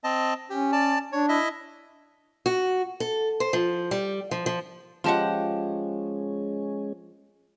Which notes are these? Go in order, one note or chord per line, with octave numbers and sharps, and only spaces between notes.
C4 D#5 A5
C#4 G4
D5 A5
D4 C#5
E4 D#5 E5
F#4
A4
C5
F3
G3
F3
F3
F3 G#3 C#4 G4 D#5 F#5 A5 C6